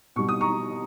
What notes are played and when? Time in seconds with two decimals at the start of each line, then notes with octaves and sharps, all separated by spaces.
0.16 B2 G3 C#6
0.29 D#6
0.41 A#5 C#6